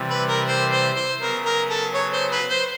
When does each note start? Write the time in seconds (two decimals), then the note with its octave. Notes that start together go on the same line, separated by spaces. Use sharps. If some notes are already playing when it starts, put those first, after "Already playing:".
Already playing: C3 E3 G3
0.10 B4
0.28 A#4
0.47 C5
0.72 C5
0.96 C5
1.20 C#3 F#3 B3 A#4
1.45 A#4
1.70 A4
1.94 C#5
2.13 C5
2.32 B4
2.50 C5